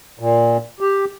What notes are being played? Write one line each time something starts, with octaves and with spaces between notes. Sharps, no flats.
A#2
G4